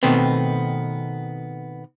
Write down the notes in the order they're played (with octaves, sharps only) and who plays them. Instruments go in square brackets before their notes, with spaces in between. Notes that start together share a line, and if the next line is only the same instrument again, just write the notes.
[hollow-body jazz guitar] B2 D#3 A3 B3 C4